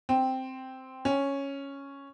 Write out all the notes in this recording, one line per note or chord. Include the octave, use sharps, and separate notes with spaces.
C4
C#4